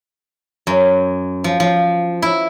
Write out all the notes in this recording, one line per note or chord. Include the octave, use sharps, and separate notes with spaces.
F#2
F3
F3
E4